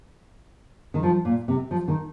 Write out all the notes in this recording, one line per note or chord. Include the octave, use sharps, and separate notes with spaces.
D#3
F3
A#2
C3
F3
D#3